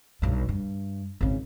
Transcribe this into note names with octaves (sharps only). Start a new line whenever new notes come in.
B1 G2
G2
G#1 C#3